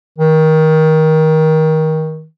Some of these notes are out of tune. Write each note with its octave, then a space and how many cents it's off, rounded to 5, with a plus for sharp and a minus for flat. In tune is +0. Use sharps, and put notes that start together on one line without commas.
D#3 +20